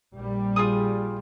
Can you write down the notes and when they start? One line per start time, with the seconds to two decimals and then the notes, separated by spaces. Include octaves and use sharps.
0.14 A#1 G3
0.56 F4 G#4 D#6